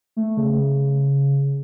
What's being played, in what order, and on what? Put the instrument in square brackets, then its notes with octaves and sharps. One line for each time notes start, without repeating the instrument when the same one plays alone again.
[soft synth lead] A3
C#3